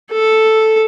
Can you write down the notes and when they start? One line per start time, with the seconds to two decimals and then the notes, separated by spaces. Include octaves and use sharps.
0.12 A4